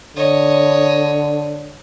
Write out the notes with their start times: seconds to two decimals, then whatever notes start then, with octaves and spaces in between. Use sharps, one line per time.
0.16 D3 C#5 D#5